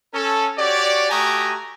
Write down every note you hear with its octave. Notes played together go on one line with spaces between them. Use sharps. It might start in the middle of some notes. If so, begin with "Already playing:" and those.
C#4 A4
F#4 G4 C#5 D5
A3 F#4 G4 G#5 A#5 D#6